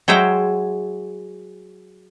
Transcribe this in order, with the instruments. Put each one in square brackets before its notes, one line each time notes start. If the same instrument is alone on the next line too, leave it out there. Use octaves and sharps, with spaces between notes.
[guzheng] F#3 G#3 C5 E5 G5 A#5